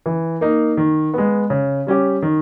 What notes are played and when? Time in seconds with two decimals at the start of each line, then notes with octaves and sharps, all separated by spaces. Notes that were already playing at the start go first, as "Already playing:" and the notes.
0.06 E3
0.41 A#3 D#4
0.77 D#3
1.14 G#3 B3
1.50 C#3
1.87 G3 C#4 G4
2.22 D#3